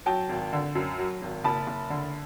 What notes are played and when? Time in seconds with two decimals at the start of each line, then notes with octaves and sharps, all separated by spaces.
0.06 F#3 G5 A5
0.29 G#1
0.53 D3
0.75 F#2
0.98 F#3
1.22 G#1
1.44 F#1 A5 B5
1.67 F#1
1.90 D3